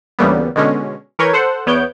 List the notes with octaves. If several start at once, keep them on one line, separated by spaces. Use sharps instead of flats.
D2 C#3 E3 G3 A#3 B3
B2 D3 G#3 C#4
E3 A#4 B4 C#5 G6 G#6
A4 C5 F#5
E2 B3 C#5 G6 D7